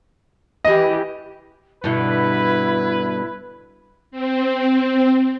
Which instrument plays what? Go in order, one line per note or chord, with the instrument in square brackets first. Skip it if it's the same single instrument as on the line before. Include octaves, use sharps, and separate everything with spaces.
[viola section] E3 G4 [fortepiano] D#5
[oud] G2 B2 D3 [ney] E4 [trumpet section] B4
[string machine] C4